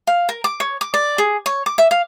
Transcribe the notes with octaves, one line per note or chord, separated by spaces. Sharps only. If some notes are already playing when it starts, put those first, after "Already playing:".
F5
A#4
D6
C#5
D6
D5
G#4
C#5
D6
E5
F5